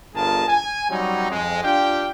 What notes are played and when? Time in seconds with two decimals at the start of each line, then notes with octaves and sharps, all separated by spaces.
0.14 G1 F4 G#4 A#4 A5
0.48 G#5
0.90 F#3 G3 C4 C#4 D#4
1.31 F2 G#3
1.64 D4 F4 G4 F5 G5